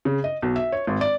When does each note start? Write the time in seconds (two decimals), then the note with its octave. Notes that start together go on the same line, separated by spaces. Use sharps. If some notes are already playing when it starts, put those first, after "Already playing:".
0.05 C#3
0.24 D#5
0.42 B1
0.56 E5
0.72 C#5
0.87 G#1
1.01 D5